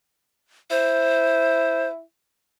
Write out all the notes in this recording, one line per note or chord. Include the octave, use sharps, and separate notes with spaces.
E4 C5